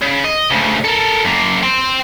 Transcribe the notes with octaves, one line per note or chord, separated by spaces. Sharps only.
C#3
D#5
D2 C#3
A4 A#4
F#2 A#3
G5 C6